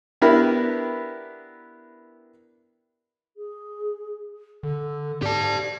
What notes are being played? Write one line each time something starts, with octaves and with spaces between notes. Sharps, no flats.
B3 D4 E4 G4 A#4 B4
G#4
D3 A4
G#2 G4 D5 A5